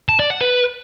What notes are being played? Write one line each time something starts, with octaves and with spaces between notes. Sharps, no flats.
A5
D5
F#5
B4